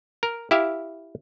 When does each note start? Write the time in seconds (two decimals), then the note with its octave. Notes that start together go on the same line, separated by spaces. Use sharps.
0.23 A#4
0.51 E4 G4 E5 F5